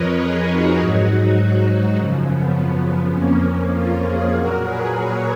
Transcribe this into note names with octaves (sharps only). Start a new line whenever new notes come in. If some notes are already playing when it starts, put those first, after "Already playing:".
Already playing: F2 F3 A#4 B4 C#5 D#5
G#4 B4
D#4 F#4
G#2 F#3
F#2 C#3 F3
B3
B3
F2 F3 A#3 C#4
A#3 C#4
C#4 F4
F4 G#4
A#2 F#3 F#4 A#4
G#4 B4
A#4 C#5